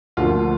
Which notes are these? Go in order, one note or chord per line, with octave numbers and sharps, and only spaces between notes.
D2 D3 F3 A#3 F4